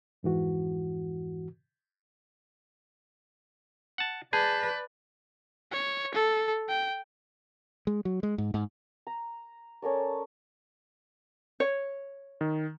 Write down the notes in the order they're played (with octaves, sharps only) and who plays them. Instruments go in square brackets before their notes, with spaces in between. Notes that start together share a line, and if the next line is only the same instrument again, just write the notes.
[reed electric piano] F2 G#2 E3 F#4
[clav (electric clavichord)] F#5 A5
[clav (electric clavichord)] G#4 [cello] B4 D5 [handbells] A5 G6
[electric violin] C#5
A4
G5
[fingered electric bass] G#3
F#3
G#3
G#2
G#2
[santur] A#5
C#4 A4 A#4 D5
[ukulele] C#5
[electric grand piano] D#3